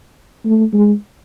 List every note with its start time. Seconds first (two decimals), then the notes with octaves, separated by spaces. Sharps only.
0.45 A3
0.73 G#3